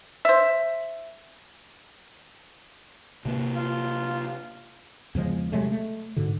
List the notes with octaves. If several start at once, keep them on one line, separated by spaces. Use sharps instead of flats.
C5 E5
C3 A#3
F4
E2 C#3 F3 G#3
C3 F#3 G#3 A3
A3
G#2 B2 D3